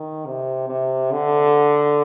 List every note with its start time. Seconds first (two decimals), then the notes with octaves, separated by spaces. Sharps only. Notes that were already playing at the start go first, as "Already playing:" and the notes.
Already playing: D#3
0.26 C3
0.69 C3
1.12 D3